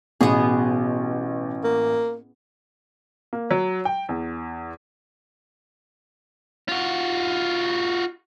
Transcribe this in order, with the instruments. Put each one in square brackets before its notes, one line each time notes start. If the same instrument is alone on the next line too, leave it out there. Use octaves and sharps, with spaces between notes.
[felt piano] A1 [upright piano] B2 [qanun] B3 G#4
[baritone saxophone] A#3
[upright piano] A#3
F#3
G5
E2
[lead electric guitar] F4 F#4